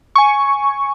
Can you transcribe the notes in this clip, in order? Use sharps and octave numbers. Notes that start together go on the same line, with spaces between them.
G#5 C#6